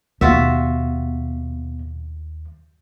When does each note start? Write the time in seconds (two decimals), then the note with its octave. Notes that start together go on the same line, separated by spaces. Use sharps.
0.21 D#2 B2 F4 F#4 E5